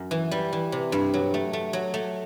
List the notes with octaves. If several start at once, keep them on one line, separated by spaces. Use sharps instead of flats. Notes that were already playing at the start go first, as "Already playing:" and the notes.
Already playing: F#2
E3
G3
E3
C3
G2
F#3
A3
A3
F#3
A3